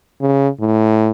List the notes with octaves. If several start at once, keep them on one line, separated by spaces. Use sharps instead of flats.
C#3
A2